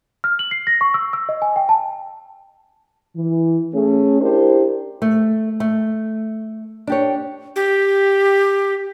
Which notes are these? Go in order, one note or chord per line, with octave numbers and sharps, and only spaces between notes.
F6
F#7
C7
A#6
C#6
E6
E6
D#5
G#5
G5
A5
E3
A3 C#4 G#4
D4 E4 G4 A#4 C5
A3
A3
D4 G4 C#5
G4